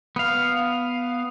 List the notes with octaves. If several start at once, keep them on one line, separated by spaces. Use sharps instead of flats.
B3 F5